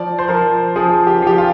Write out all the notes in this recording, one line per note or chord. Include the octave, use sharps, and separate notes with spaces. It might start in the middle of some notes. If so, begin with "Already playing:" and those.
Already playing: F3 D5
C5
F3 A#4
F3 G#4
G4
F3 G4
F4